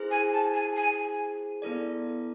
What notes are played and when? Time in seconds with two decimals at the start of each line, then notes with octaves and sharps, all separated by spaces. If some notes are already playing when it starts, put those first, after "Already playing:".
Already playing: E4 G#4 C5
0.11 G#5
0.33 A5
0.54 G#5
0.76 G#5
1.62 B3 E4 A4 D5